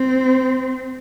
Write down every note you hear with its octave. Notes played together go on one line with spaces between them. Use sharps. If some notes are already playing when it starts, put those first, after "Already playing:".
Already playing: C4